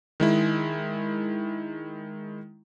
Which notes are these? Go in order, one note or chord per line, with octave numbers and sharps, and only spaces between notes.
D#3 G#3 E4